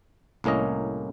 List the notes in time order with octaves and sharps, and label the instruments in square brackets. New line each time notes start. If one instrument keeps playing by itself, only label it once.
[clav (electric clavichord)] C2 A2 A#3 C#4 D#5